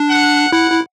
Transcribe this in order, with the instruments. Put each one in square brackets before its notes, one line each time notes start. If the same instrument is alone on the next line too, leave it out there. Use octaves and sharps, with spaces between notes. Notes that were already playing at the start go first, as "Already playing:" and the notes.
Already playing: [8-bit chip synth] D4
[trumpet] F#5
[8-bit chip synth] E4 [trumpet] F#5
[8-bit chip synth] E4